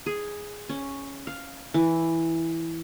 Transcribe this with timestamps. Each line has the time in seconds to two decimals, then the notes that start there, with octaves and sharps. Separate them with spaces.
0.06 G#4
0.69 C#4
1.27 F5
1.74 E3